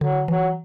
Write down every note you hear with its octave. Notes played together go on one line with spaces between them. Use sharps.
D3 F#3
E3 F#3